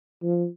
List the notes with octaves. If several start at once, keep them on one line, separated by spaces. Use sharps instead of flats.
F3